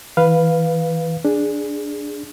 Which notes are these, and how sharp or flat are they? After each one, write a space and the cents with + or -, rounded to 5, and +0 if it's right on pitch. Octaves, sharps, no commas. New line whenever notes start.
E3 -25 B4 +0 F5 +0
D4 +0 G#4 +0